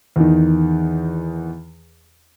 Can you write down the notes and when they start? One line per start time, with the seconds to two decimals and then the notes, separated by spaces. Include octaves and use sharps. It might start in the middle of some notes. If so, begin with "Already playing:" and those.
0.16 E2 D#3